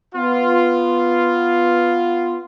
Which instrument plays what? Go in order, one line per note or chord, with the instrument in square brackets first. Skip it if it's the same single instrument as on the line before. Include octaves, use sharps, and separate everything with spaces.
[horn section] B3 F4